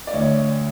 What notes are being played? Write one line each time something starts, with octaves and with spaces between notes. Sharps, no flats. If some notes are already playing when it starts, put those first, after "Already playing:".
D5
D2 C#5